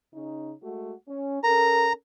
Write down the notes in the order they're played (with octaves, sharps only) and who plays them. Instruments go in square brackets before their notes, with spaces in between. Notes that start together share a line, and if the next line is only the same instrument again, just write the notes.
[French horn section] C#3 C#4 D#4
G#3 A3 F#4
C#4
[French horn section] C#4 A4 A#4 [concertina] A#5